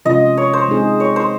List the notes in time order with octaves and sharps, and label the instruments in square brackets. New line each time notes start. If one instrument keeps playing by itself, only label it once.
[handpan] C3 F3 G#3 C#4 F4 [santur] D#5
[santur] C#5
C5
[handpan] G#3 C4 D#4 G#4
[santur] C#5
C5